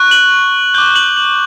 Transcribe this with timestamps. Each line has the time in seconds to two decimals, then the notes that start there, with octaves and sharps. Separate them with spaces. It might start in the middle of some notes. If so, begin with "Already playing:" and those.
Already playing: C#6 F#6
0.11 F#7
0.74 D6 G6 G7
0.96 F#7
1.17 F#7